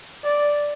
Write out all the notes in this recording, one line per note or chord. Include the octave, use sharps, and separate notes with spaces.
D5